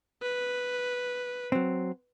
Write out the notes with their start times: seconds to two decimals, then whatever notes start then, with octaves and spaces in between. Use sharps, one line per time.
0.22 B4
1.52 F#3 C4